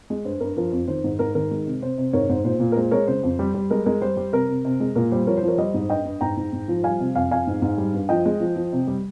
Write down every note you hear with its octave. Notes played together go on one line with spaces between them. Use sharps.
G#3
G2 C5
G2 A#4
F3 A#4
F2
D#3 C5
G#2
G#2 A#4
D#3 A#4
G#3
C3
C3 C5
C3
G#2 A#4 C#5
G#2 C5
A#2 C5
A#2
A#4
G#3 C5
G#3 A#4 C#5
C#3 C5
F2
G3
G3
G#3 A#4
G#3 A#4
G3 C5
G3
C3 A#4
C3
C3
G#3
A#2 A#4
G3 C5
F3 A#4 C#5
C5
F3
A#4 C#5
G3 C5 D#5
G#2
G2 D#5 G5
G2
G#2 G5 A#5
G#2
G#2
F3
G3 F5 G#5
C3
F2 F5 G#5
F2 F5 G#5
G#2
G#2
G3
G2
F3 D#5 G5
G#3
F3
F3
C3
G3